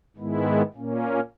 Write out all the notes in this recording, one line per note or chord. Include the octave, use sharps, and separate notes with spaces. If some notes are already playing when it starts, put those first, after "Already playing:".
G#2 D#3 G#3 B3 E4
A#2 A#3 C#4